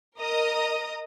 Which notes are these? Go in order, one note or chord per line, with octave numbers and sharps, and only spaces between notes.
A#4 D#5 A#5 D#6